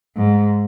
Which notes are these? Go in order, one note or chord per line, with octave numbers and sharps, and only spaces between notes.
G#2